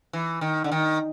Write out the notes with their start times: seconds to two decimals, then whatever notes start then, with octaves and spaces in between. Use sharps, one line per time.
0.13 E3
0.41 D#3
0.64 D3
0.72 D#3